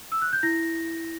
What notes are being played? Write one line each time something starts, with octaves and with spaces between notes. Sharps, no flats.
E6
F#6
G6
E4 A#6